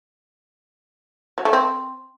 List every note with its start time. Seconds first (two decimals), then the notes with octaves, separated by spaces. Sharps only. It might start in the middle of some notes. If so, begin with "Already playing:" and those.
1.38 F#3
1.45 A3
1.53 C4